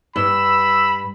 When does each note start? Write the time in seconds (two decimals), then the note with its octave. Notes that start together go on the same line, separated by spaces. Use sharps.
0.16 G2 B5 E6